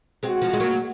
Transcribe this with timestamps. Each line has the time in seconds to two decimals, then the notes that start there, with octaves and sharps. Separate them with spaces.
0.23 G#3 C4 F#4
0.42 F3 G#3
0.53 G#3
0.60 F#3 A#3